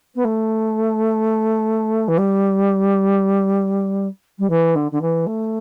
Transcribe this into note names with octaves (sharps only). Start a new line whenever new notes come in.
B3
A3
E3
G3
G3
E3
D3
D3
E3
A3